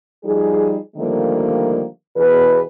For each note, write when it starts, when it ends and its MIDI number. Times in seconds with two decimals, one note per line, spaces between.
0.24 0.77 53
0.24 0.77 55
0.24 0.77 63
0.24 0.77 68
0.97 1.85 50
0.97 1.85 51
0.97 1.85 53
0.97 1.85 55
0.97 1.85 57
0.97 1.85 58
2.16 2.62 40
2.16 2.62 47
2.16 2.62 68
2.16 2.62 71